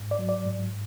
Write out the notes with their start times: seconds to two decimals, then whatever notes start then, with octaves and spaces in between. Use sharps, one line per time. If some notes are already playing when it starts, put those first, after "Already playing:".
Already playing: G#2
0.11 D5
0.19 F#3
0.29 D5
0.46 G#2